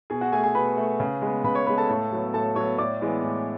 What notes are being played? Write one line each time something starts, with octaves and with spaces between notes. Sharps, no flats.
B2 G#4
F#4 F#5
A3 G#4 G#5
G#4 G#5
B2 B4 B5
A3
C#3
G#3 B3
C#3 B4 B5
C#5 C#6
G#3 B3 B4 B5
A4 A5
A2
F#3 B3
A2 A4 A5
F#3 B3 C#5 C#6
A2 D5 D6
E3 G#3 B3
A2